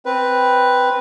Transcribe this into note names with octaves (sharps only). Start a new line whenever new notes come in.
C4 B4